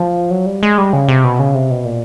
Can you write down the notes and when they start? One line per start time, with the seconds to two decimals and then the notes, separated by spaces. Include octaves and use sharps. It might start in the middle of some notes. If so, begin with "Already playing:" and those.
Already playing: F3
0.31 F#3
0.46 G3
0.63 G#3
0.78 G3
0.93 C#3
1.08 C3
1.24 B2
1.39 C#3
1.55 C3
1.71 B2
1.85 A#2